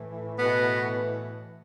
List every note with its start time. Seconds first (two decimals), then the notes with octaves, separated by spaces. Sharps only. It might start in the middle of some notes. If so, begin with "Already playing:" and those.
Already playing: A2 E3
0.39 B2 B3